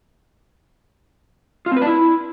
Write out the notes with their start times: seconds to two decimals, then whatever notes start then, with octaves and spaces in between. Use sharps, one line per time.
1.66 F4
1.71 C4
1.76 B4
1.82 D4
1.87 E4